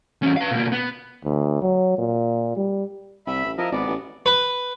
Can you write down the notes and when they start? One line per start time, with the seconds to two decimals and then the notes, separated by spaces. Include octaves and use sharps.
0.22 E2 C#4
0.36 B4 F5
0.51 B2 A#3
0.72 B3
1.25 D2
1.62 F#3
1.99 A#2
2.57 G3
3.27 C2 E5 B5
3.45 A1
3.58 F3 E4 A#4 D#5
3.72 G#1 B3 D5
3.87 A1
4.26 B4